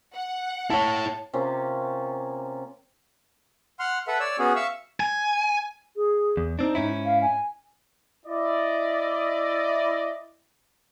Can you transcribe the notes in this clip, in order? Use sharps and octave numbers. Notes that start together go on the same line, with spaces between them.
F#5
E4 C#5 A5
C3 A#3 C#4 F4
F#5 C6 F6
A4 B4 E5 F#5
C#5 D5 E6
B3 C#4 F#4 G#4
E5 F5 C#6 E6
G#5
G#4
E2
C4 D4 D#4
G#2 C#4 E4
F5
G#5
E4 D5 D#5